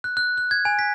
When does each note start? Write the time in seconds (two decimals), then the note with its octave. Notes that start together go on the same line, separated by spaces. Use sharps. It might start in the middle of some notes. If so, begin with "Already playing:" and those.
0.04 F#6
0.17 F#6
0.38 F#6
0.51 G#6
0.65 G#5
0.79 B6